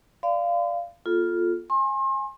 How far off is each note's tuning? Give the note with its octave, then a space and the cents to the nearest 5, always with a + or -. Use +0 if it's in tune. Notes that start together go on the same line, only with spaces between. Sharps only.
D5 +0 F5 -15 C6 -45
B3 -40 F4 +5 A4 -10
G#5 +0 C6 +40